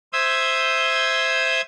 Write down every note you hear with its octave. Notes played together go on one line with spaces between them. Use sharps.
C5 E5 D#6 E6 G6 G#6